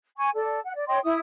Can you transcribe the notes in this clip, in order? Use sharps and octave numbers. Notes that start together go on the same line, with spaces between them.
G#5 C#6
A4 D5
F#5
D5
C#5 D#5 G5 C6
E4 E5 D#6